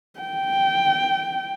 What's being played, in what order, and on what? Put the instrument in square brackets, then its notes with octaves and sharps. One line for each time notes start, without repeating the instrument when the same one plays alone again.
[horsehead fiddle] G5